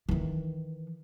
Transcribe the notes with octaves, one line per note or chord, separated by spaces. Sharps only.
D#3 E3